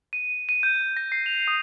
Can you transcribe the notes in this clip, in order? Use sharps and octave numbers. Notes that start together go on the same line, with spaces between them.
D#7
D#7
G6
A#6
C7
F7
D#6